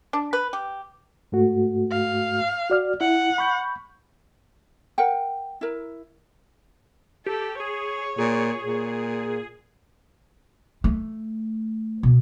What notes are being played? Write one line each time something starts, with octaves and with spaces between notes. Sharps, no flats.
D4
B4
G4
G#2 A3 F#4
F5
F#4 D5 F6
E4 F#5
B5 C#6 G6
A#4 F#5 G5
E4 A#4
G4 A4
G#4 C#5
A#2 G#4
A#2
A3
B2